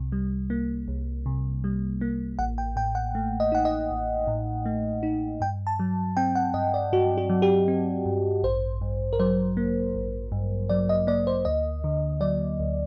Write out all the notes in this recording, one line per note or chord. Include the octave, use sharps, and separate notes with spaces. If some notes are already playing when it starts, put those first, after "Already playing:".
Already playing: C2 C3
G3
A#3
C2
C3
G3
A#3
A1 F#5
G5
A2 G5
F#5
A3
D#5
D#4 F#5
D#5
A1
A2
A3
D#4
G2 G5
A5
F#3
C4 G5
F#5
G2 D#5
D5
G2 F#4
F#4
F#3
G4
C4
G2
A1 C5
G2
A#4
F#3 C5
A#3
A1
G2
F#3 D5
D#5
A#3 D5
C5
D2 D#5
D3
F#3 D5
D2